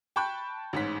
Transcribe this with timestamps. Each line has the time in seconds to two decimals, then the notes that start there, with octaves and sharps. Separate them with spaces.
0.16 G5 A5 B5 C#6 F#6 G6
0.73 A1 G#2 B6